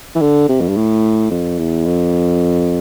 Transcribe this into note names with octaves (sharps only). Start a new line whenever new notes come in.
E3
D3
C3
F2
G2
A2
F2
E2
F2